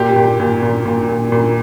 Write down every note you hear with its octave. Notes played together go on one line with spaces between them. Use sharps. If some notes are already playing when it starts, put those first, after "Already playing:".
Already playing: A#2 G4
A#2
A#2
A#2
A#2
A#2
A#2